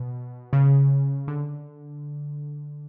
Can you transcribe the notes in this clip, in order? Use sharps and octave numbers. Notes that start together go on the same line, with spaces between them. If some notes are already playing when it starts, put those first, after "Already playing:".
Already playing: B2
C#3
D3